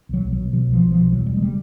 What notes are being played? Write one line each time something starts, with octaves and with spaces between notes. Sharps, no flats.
B1 F#3
B1
F#3
B2
B2 F#3
B1
F3
B1
F3
B2
E2 F#3
E1 G3
G#3
C#3 G3